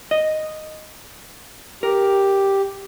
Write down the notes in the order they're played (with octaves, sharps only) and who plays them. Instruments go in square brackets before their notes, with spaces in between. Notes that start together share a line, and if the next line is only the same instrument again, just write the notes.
[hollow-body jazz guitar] D#5
[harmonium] G4 [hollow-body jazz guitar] A#4